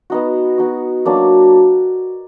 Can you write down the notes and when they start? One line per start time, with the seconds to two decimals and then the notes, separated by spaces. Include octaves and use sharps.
0.10 B3 D#4 F#4
0.58 B3 D#4 F#4
1.05 F#3 A#3 D4